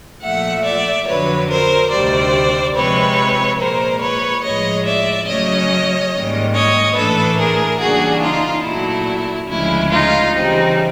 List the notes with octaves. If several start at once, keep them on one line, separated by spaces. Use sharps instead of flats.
A#2 F3 A3 E5 F#5
D5 E5
F2 D3 F#3 B4 C#5
A#4 C5
D2 C3 D#3 G3 C5 D5
C3 F3 G#3 C4 B4 C#5
A#2 F3 G#3 A#4 C5
B4 C#5
A2 F3 G#3 C#5 D#5
D5 E5
C#3 F#3 A3 C#4 C#5 D#5
G#2 D#3 G3 A#3 C#4
C#5 D#5
A2 E3 A3 D4 A4 B4
G#4 A#4
C#3 E3 G3 A#3 D4 F#4 G#4
D#4 F4
A#2 F#3 A3 E4
D2 C#3 F3 G#3 C#4 E4
D#4 F4
C#3 E3 G3 C4 D#4